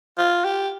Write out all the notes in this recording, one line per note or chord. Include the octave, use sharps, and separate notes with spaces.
F4
G4